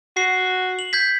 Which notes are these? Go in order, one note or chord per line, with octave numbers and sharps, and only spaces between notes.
F#4 C7
F#7
G6 G#6 B6